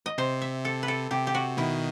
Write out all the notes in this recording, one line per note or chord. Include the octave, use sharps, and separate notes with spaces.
D#5
C3 C5
E5
A4
B4
A4
C3 G4
G4
F#4
B2 D#3 E4